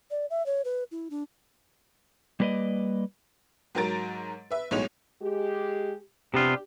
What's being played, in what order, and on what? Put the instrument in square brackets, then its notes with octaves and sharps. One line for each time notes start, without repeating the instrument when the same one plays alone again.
[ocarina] D5
E5
C#5
B4
E4
D4
[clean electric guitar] G3 A#3 B4 D5 D#5
[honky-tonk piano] G#2 F#3 A#4 A#5 A6 D7
B4 E5
B1 A2 G#3 D#4 C#5 F7
[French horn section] G#3 G4
[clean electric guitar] C3 B3 F4 [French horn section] D4 G4